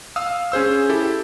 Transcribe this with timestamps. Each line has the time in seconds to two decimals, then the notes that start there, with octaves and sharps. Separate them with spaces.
0.16 F5 D#6 E6
0.52 C#4 G#4 C5 E6
0.89 E4 G4 A4